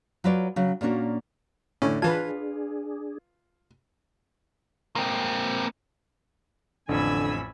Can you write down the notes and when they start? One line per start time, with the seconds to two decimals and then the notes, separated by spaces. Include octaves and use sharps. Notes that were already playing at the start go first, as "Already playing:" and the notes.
0.24 F#3 F4 B4 C#5 D5
0.56 C#3 F#3
0.81 A#2 A#3 B3 C#4 D4 F#4
1.82 A2 D3 C#4 C#5
2.02 E3 D4 F4 G#4 B4 A5 G#6
4.96 A#3 C4
6.89 A1 F2 D3 G#5 B5 E6